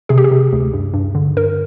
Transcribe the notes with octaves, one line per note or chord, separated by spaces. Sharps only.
C3 G#4
G4
G#4
C3
D2
G2
G2
D3
G2 A#4